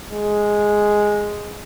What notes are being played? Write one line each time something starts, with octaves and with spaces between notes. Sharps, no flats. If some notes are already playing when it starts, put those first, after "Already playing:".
G#3